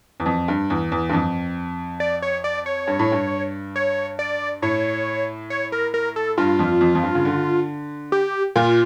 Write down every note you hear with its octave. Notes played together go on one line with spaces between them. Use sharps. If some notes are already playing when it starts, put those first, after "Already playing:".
E2
F2
G2
E2
E2
G2
F2
D5
C#5
D5
C#5
G2
A2
G2
C#5
D5
A2 C#5
C#5
A#4
A#4
A4
G2 F4
F2
F2
F2
G2
C#3
D3
G4
A#2 F4